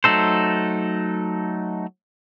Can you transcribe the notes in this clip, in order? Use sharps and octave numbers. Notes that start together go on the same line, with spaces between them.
F#3 A3 D#4 A4 C5